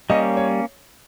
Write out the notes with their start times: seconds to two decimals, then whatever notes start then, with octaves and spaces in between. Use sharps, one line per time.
0.10 G3 A#3 C#4 D#5
0.37 C#5